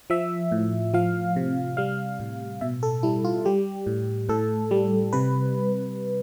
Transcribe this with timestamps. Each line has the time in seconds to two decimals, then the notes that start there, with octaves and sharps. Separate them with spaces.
0.10 F3 E5
0.52 A2
0.94 F3 F5
1.36 C3
1.77 G3 F5
2.20 A2
2.61 B2 E5
2.83 A4
3.03 G3 E4
3.24 F4
3.46 G3 G4
3.87 A2
4.29 A2 A4
4.71 G3
5.13 C3 B4